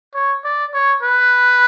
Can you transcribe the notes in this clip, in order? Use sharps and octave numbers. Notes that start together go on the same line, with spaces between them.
C#5
D5
C#5
B4